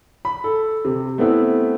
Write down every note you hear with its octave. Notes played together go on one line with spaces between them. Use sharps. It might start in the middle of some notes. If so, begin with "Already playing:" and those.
B5
A4
C3
A3 B3 C4 E4